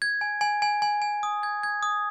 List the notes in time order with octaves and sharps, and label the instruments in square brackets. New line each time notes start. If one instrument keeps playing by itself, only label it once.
[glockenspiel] G#6
G#5
G#5
G#5
G#5
G#5
D#6
G#6
G#6
D#6